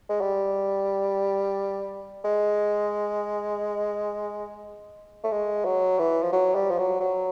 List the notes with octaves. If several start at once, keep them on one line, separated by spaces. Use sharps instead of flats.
G#3
G3
G#3
A3
G#3
F#3
E3
F3
F#3
G3
F3
F#3
F#3